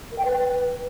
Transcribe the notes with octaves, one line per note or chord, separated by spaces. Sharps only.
A#4
G5
B4